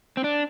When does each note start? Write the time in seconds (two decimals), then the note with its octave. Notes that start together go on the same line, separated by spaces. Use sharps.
0.17 C4
0.24 D4